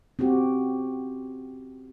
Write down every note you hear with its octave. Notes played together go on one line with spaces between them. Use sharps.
C4 C#4 F#4 G4